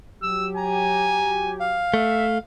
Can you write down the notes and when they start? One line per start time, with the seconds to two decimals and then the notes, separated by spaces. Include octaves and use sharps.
0.23 F#3 G4 E6
0.57 G#5 A#5
1.60 F5
1.94 A3 E5